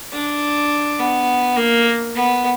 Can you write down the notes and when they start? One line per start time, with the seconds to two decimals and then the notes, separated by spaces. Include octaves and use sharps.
0.13 D4
0.99 B3
1.57 A#3
2.15 B3